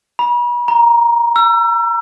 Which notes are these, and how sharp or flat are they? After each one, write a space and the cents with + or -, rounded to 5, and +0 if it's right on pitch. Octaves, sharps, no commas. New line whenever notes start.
B5 -40
A#5 +10
E6 +35